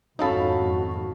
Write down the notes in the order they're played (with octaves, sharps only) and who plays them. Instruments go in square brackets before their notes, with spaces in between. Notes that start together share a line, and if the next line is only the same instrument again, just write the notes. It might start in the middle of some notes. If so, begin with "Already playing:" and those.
[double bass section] G#1 F2 [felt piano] C#4 F5 B5 [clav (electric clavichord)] D#4 A4 [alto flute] F#4